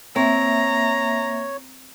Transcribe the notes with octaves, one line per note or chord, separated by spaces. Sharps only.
A#3 C4 C#5 E5 A#5